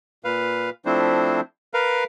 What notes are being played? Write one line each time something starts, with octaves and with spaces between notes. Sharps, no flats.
A#2 B4 F5
F3 A3 C4 D4 E4 C5
A#4 B4 F5